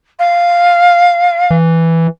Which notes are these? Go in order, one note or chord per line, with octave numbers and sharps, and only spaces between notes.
F5
E3